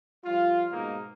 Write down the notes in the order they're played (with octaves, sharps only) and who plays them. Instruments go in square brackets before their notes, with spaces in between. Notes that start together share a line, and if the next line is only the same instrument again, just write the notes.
[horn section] F3 G3 F4
G#2 B2 G#3 A#3 D#4